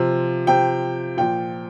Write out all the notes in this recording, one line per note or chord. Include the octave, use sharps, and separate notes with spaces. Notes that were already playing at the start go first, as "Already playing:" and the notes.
Already playing: C3 F3
C3 F3 G5
A#2 F3 G5